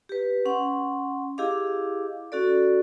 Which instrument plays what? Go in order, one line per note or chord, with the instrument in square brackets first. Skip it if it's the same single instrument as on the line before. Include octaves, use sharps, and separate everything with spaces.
[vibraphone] G4 B4
C#4 F#5 C6
E4 G4 G#4 D#5 F5 D6
C#4 F#4 A4 D5